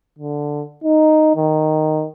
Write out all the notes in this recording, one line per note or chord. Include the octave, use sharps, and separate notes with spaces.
D3
D#4
D#3